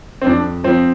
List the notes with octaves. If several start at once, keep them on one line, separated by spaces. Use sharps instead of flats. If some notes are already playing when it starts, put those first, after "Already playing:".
C4
F2 D4
F3 C4